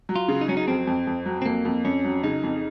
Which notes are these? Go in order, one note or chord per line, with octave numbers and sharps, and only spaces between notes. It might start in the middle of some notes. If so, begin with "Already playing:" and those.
F#3
F4
C#3
D#4
F#3 C#4
D#4
F2 C4
F2
F2
F#3
C4
F2 A#3
F2
F2 C#4
F#3
C#3 D#4
F2